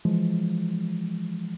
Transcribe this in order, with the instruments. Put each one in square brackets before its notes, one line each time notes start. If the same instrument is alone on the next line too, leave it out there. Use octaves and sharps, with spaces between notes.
[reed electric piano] E3 F3 G#3